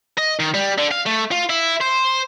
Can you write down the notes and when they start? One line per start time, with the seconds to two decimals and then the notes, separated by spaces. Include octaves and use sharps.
0.18 D#5
0.39 D#3
0.54 G3
0.78 D3
0.92 F5
1.06 A3
1.31 F4
1.50 E4
1.81 C5